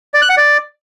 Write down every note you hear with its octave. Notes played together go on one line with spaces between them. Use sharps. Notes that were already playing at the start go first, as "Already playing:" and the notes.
D5
F#6
F#5
D5